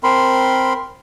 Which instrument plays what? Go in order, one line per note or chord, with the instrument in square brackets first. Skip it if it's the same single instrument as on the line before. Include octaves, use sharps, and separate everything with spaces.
[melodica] C4 A#4 B5 C6